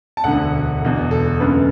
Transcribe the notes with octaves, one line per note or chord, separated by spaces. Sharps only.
A5
E1 D2 D3 F#5
E1 E2 B2
A4
F#1 F#2 D3 B4